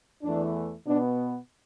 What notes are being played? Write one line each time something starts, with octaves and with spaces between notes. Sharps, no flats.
E2 E3 A3 D4
B2 B3 D4